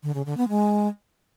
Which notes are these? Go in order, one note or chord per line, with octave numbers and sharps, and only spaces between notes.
D3
C#3
D3
B3
G#3